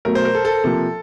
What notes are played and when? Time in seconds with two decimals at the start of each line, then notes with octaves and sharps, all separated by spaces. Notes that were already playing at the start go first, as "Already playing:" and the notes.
0.05 B2 F#3 A3 A#4
0.15 C5
0.25 A#4
0.35 A4
0.45 A4
0.64 C3 F3 A#3 A4